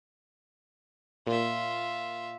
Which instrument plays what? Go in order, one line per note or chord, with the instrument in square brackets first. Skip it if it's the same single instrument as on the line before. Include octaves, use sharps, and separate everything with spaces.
[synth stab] A#2 [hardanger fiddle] F4 E5